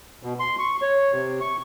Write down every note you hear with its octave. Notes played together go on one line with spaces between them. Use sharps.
B2
C6
C#6
C#5
C3
C#6